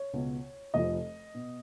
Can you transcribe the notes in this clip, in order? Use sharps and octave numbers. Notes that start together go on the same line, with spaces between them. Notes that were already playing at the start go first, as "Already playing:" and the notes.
Already playing: C#5
C#2 B2
F1 F2 F3 D#5
B2